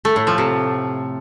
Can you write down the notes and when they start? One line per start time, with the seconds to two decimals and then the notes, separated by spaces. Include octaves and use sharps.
0.05 A3
0.16 A2
0.27 F3
0.38 C3